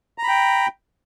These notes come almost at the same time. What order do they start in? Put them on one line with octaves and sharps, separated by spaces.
A#5 B5 G5